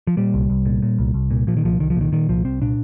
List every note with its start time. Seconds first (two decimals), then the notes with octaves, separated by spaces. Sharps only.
0.07 F3
0.17 A#2 G3
0.34 C2
0.50 C2
0.66 A#2
0.82 A#2
0.98 C2
1.14 C2
1.30 A#2
1.47 A#2 F3
1.57 D#3
1.64 C2 F3
1.79 C2 D#3
1.90 F3
1.96 A#2
2.01 D#3
2.12 A#2 D#3
2.29 C2 F3
2.45 C2 C4
2.61 A#2 D4